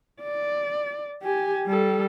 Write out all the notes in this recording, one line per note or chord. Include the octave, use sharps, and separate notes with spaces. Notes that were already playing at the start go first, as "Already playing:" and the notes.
D5
G4 G#5
G3 A4